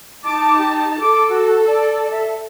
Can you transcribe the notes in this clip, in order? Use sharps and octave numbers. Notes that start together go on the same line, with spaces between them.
D#4 A5 D6
G4
A4 D6
F#4
D5
E5